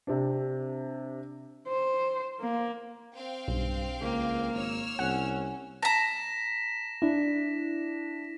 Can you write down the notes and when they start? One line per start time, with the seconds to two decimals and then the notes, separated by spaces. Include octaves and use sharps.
0.07 C3 C4 D4
1.68 C5
2.40 A#3
3.14 C4 F5 G5
3.48 B1 G2
4.01 C#2 A#3
4.54 G#1 C#5 E6 F6
4.99 C2 C#4 F#5
5.83 A5 A#5 A#6 B6 E7
7.02 D4 E4